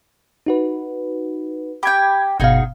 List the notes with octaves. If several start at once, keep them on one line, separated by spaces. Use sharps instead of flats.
D#4 F#4 B4
G4 G5 B5 G#6
G1 B2 D#4 F#4 G#4 F5